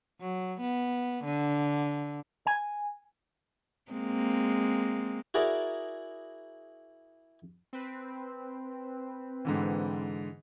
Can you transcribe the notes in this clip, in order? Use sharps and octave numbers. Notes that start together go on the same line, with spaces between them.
F#3
B3
D3
G#5
G#3 A#3 C4
E4 F#4 G#4 A#4 D5 A#5
C4 B4
G#2 D3 E3